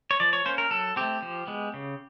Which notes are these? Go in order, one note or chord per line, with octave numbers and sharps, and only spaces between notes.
C#5
F3 D5
C#5
A#3 C#4 C5
A#4
F#3 A4
A3 C4 G4
F3
G#3 B3
C#3